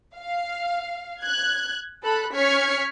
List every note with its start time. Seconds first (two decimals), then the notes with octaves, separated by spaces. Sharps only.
0.17 F5
1.22 F#6 G#6
2.04 A4 B5 F#6
2.36 C#4 C#6 F6 G#6 B6 C#7